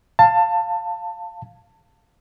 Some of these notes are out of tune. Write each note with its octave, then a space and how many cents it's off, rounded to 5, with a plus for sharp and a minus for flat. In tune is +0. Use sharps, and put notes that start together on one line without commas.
F5 +0 A5 +20